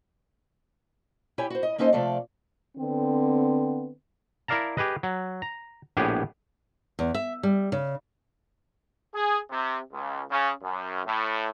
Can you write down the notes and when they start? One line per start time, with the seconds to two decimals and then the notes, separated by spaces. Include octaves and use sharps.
1.38 E4 G4 C#5 G5 G#5
1.50 F#4 C5
1.63 D#5
1.78 A#3 C#4 D#4 A4 C5 D#5
1.93 C3 F3 A3 A4 D5 F5
2.78 D3 B3 C4
4.48 E4 A#4 D5 F5 A5 A#5
4.77 G4 G#4 B4 D#5
5.03 F#3
5.42 A#5
5.97 A#1 A2 B3 G4 G#4
6.99 E2
7.14 E5
7.43 G3
7.72 C#3
9.14 G#4
9.51 C3
9.92 C#2
10.30 C#3
10.63 F#2
11.05 A2